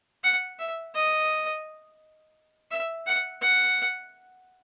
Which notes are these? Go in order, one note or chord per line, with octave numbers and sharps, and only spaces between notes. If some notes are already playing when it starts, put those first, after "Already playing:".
F#5
E5
D#5
E5
F#5
F#5